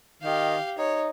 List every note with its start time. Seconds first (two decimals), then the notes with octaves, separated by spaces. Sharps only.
0.22 D#3 G4 F5
0.78 D#4 C#5